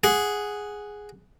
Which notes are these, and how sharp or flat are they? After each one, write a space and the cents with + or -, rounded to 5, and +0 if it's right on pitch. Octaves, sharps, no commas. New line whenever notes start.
G#4 +0 F#5 +0